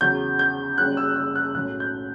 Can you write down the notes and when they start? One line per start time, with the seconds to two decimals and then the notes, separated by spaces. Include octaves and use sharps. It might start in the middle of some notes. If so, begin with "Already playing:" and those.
0.01 E2 C#3 F#3 G6
0.39 G6
0.78 F#1 F#2 C#3 G3 F#6
0.97 E6
1.16 E6
1.35 F#6
1.54 B1 A2 F#3 C#4 F#6
1.80 G6